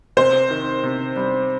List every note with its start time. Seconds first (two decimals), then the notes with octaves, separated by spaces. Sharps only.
0.17 C3 C5
0.50 D#3
0.84 C3
1.16 G3